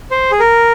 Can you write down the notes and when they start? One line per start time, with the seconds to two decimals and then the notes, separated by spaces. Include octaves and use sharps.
0.11 C5
0.31 G#4
0.40 A#4